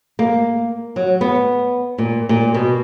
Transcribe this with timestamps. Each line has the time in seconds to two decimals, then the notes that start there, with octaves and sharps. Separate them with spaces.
0.19 A#3
0.96 F#3
1.21 B3
1.98 A#2
2.29 A#2
2.54 B2